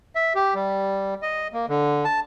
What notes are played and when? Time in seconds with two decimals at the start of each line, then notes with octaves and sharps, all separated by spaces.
0.15 E5
0.35 G4
0.54 G3
1.22 D#5
1.53 A#3
1.69 D3
2.05 A5